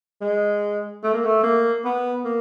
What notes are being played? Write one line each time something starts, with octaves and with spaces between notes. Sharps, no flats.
G#3
A3
A#3
A3
A#3
B3
A#3